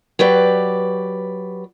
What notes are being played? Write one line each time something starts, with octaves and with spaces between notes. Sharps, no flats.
F#3 G4 B4 D5